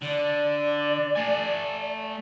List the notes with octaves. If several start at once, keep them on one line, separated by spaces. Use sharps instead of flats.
D3 D5
A3 G#5